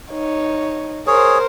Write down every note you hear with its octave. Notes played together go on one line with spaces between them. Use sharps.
D#4 C#5
G#4 A#4 C5 C#5